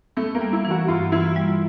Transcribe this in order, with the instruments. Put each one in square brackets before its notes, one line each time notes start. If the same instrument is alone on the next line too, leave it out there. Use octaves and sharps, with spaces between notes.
[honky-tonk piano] A3 [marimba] B3
[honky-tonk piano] A#3
[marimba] G3
[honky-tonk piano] E4
[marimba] E3
[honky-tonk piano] F#4
[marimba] G2 [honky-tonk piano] F4
[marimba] E3 [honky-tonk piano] E4
[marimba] G3